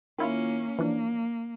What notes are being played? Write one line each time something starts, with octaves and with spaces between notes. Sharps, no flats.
D#3 A#3 C#4 E4 F4
E3 F3 A#3 D4